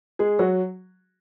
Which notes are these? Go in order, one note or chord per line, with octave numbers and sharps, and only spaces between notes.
G#3 G#4
F#3 F#4